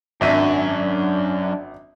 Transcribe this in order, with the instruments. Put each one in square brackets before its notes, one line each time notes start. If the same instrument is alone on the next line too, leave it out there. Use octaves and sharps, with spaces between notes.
[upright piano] G#1 E5 D#7 [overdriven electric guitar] F#2 [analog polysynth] D4